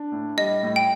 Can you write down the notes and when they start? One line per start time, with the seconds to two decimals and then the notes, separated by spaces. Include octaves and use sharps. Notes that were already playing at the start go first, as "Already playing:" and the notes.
Already playing: D4
0.12 A2
0.37 G3 D#5
0.63 A2
0.76 G5